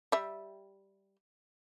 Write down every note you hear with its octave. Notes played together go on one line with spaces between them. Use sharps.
G3 E5